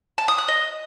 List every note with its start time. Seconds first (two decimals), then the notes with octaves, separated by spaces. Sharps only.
0.18 A5
0.28 D#6
0.38 F#6
0.48 D#5